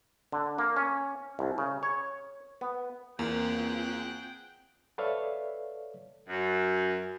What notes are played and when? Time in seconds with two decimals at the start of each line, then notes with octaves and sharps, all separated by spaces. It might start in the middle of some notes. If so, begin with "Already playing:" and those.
0.32 D3
0.58 A#3
0.76 C#4
1.39 C2
1.58 C#3
1.83 C#5
2.61 B3
3.19 E2 A#3 C4 F4 G#4 F#5 G5
4.98 A4 B4 C#5 D5 E5 F5
6.28 F#2